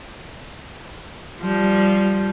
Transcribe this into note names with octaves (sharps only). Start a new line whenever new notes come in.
F3 G3